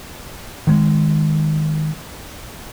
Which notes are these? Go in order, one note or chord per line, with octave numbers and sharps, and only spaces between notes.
D#3 G#3